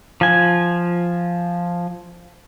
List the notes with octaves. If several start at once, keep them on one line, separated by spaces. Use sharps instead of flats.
F3 G#5